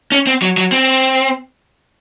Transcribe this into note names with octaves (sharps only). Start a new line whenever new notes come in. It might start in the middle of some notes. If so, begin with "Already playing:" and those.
C#4
C4
F#3
F#3
C4